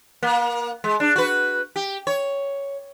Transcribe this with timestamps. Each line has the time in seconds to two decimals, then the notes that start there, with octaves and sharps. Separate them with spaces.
0.23 A#3
0.84 G#3
1.00 D4
1.16 F#4 B4
1.76 G4
2.07 C#5